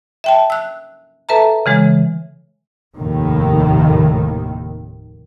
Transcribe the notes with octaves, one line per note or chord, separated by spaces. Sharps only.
E5 G5 A5
E6 F#6
A4 B4 E5 A5 A#5
C#3 E3 G#3
F1 D#2 A2 D#3